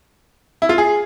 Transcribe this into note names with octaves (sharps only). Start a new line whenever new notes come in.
E4
F4
G#4